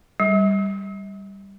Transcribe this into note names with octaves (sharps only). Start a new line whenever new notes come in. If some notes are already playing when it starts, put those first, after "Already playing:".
G3